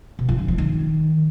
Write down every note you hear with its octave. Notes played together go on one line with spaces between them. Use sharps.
B2
F3
D3
F3
D#3